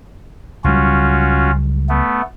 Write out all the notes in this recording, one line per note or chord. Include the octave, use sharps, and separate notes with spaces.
C#2 F#3 G3 C#4 F4 F#4
A3 B3